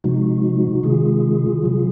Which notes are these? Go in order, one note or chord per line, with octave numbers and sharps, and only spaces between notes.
C3 F3 G#3 D#4 F#4
C3 D#3 G#3 F4 G#4
C3 F#3